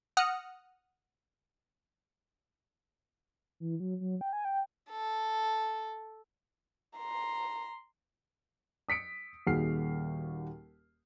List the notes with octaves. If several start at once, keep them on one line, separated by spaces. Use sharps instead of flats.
F#5 D#6 F6 F#6 A#6 C#7
E3
F#3
F#3
G5
G#5
G5
A4
A#5 C6
D#6 B6 C#7 D7
D#1 D#2 F#4 G#4 F6 C7